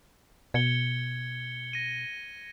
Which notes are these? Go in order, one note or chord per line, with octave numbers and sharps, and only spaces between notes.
B2 G#6 C#7 G7
A#6 D#7